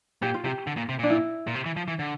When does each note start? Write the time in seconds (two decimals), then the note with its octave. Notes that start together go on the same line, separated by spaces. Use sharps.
0.22 A#2 G4
0.34 F4
0.44 C3 G4
0.67 D3
0.77 A#2
0.89 C3
0.99 A#2 D4
1.10 E4
1.47 A#2
1.55 C3
1.66 E3
1.77 F3
1.88 E3
1.99 D3